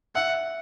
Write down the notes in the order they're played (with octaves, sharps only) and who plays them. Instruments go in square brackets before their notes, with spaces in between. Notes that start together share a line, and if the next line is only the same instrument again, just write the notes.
[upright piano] E5 E6 [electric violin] F#5